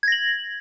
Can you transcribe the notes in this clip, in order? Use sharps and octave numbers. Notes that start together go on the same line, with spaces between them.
G#6 A#6 F#7